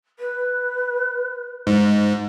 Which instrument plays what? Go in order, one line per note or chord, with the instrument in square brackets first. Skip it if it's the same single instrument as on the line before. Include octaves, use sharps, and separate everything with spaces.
[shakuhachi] B4
[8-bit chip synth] G#2